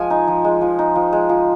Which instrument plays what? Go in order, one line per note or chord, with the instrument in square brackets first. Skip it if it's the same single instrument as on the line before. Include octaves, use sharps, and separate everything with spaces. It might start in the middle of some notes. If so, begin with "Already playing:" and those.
Already playing: [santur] F3 G#3 G#5
D#4
F3
G#3
F3
D#4
F3
G#3
F3